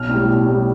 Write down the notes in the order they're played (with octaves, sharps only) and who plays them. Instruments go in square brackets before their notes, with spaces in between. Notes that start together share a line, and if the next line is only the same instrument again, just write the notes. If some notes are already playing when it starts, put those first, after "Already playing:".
Already playing: [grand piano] B1 F6
A2 G3
B1
A2 G3